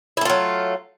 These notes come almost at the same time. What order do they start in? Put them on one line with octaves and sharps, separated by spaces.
E4 A3 F4 F#3